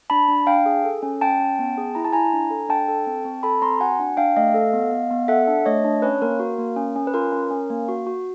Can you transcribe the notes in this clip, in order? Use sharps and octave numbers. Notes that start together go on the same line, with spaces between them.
D4 A5 B5
D4
D4 F5 G5
G#4
A4
C#4
C#4 G5 A5
C#4
B3
G#4
E4 A#5
A5
E4 G#5 A#5
D4
A4
D4 G5 A5
A4
C4
C4
A4 A5 B5
C4 A#5 C6
F#4 F#5 G#5
D4
D4 F5 G5
A3 D#5 F5
A4
B3
B3
B3
A4 E5 F#5
D4
A3 C#5 D#5
D4
C#4 B4 C#5
A#3 A#4
F#4
A#3
C#4
C#4
B4
F4 A#4
C#4
C#4
A#3
F#4
F#4